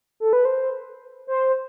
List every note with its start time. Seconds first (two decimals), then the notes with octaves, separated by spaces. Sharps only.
0.20 A4
0.33 B4
0.45 C5
1.27 C5